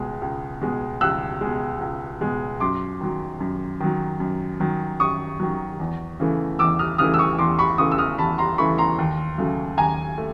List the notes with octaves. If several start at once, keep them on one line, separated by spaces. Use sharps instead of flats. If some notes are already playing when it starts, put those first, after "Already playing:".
Already playing: C#2 B2 G#3
C#2
B2 G#3
C#2 E6 F#6
B2 G#3
C#2
B2 G#3
F#2 C6 D6
D#3 F#3
F#2
D#3 F#3
F#2
D#3 F#3
F#2 C#6 D#6
D#3 F#3
E2
C#3 E3 A3
E2 D6 E6
D#6 F6
C#3 E3 A3 D#6 F6
E6
C#6 D#6
E2 C6 D6
B5 C#6
C#3 E3 A3 C#6 D#6
E6
D#6 F6
E2 A5 B5
A#5 C6
C#3 E3 A3 B5 C#6
A#5 C6
D#2
C#3 F#3 A3
D#2 G#5 A#5
A3